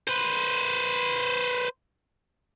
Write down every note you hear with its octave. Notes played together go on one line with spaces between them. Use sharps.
B4 C5